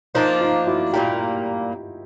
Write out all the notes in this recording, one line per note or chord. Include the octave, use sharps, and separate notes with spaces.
F3 A#3 D4 D#4 F4
D#4 F4
E4 F#4
A#2 G3 A#3 F4 G4